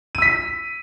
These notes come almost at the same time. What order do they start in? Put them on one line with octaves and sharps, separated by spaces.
D#7 E6 B6